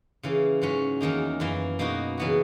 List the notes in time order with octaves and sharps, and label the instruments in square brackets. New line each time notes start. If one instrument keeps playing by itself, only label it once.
[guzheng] C#3 E3 A#3
G#2 F#3 C#4
E2 D#3 A#3 D#4
F#2 E3 A#3 E4
B2 A#3 D#4 F#4
C#3 E3 B3 F#4